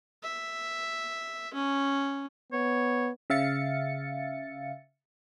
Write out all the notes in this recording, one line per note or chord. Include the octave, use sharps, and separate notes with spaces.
E5
C#4
B3 C#5
C#3 E5 F5 A6 C#7